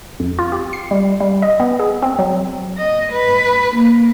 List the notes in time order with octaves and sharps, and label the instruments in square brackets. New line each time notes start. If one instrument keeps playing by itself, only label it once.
[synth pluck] F2
F4
G4
C7
G3
G3
D#5
B3
G#4
C4
F#3
[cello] D#5
B4
A#3